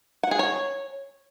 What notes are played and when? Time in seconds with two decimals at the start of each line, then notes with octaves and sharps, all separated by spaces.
0.23 F#5
0.31 G#4
0.39 C#5